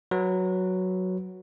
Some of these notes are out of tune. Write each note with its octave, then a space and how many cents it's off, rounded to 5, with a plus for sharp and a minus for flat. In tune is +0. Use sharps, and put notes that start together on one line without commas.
F#3 +0 B4 +0